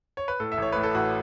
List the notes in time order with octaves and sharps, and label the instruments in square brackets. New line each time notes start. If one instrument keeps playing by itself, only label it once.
[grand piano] C#5
B4
A2 A4
E5
A1 C#5
A2 B4
A4
A1 F#4